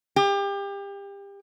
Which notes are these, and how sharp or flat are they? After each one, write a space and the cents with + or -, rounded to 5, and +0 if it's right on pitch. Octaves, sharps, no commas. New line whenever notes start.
G4 +30